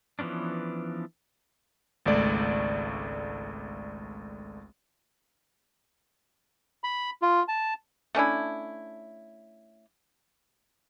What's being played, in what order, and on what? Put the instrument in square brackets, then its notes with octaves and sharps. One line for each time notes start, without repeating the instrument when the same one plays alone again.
[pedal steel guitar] E3 F3 B3 C#4 D4
[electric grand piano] G#1 C#2 A3 D5
[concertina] B5
F4
A5
[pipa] A3 C#4 D4 E4